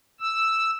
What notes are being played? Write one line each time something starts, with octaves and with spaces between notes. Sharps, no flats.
E6